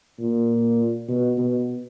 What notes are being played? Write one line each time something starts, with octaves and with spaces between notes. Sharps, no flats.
A#2
B2
B2